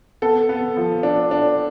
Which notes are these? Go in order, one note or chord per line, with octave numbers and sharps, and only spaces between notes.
B3 A4
B3
F3
D4
D4